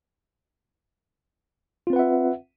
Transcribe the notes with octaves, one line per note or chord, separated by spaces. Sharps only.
C4 F4 B4 E5 F#5